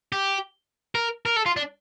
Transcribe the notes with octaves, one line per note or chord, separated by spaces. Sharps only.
G4
A#4
A#4
A4
F4
D4